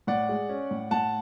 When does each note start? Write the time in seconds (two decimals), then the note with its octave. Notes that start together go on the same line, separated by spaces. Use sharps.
0.07 A2 D5 F#5
0.29 G#3
0.49 C#4
0.71 A2
0.91 A2 F#5 A5